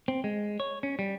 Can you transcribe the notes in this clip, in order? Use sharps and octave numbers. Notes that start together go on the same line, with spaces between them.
C4
G#3
C#5
C#4
G3